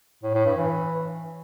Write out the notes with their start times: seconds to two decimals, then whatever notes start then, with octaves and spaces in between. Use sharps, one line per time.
0.23 A2
0.34 A2
0.46 G2
0.57 E3